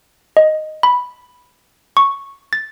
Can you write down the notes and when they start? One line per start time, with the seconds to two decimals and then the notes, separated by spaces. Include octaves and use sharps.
0.37 D#5
0.83 B5
1.97 C#6
2.53 A6